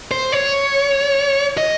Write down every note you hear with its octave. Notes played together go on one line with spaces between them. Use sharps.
C5
C#5
D#5